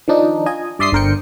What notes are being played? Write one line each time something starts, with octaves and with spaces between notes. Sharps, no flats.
D#3 F3 D4 D#4
F4 D#5 G#5
G2 D5 E5 C6 D#6 C7
G1 D3 A#4 C5 G5 C#7